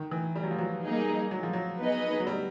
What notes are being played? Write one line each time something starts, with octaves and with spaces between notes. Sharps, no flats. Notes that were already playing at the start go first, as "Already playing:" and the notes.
Already playing: D#3
E3
G3
F#3
F3
F#3
G3 A#3 D#4 G#4
F#3
F3
F#3
B3 D#4 G#4 B4 D#5
F#3
G3